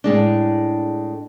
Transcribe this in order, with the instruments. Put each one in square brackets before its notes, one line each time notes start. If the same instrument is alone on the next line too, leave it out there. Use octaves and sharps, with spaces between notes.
[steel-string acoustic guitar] A2 G#3 D4